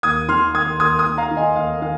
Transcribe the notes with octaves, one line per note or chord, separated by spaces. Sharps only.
D#2 D#6 G#6
D#3 C6 F6
D#2 D#6 G#6
D#2 D#6 G#6
D#6 G#6
D#2
F5 A#5
D#3
D#5 G#5
D#2 F5
D#3 F5